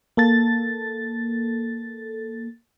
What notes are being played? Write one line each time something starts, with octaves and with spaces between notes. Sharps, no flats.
A#3 A4 A6